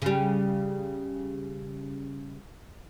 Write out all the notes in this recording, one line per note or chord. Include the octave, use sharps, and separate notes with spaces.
C#3 G3